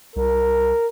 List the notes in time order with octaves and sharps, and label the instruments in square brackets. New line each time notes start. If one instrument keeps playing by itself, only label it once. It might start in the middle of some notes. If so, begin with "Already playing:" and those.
[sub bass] C2 [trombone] A#4